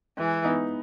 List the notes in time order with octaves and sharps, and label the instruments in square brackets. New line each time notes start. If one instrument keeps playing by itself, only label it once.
[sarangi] E3 [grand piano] G#3
[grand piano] B3 D#4